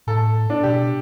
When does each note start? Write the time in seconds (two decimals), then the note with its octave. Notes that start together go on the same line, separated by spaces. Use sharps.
0.07 A2 A4
0.50 D4
0.63 B2 G4